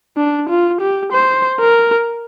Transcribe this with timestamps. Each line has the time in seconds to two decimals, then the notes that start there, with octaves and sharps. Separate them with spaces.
0.17 D4
0.49 F4
0.81 G4
1.12 C5
1.60 A#4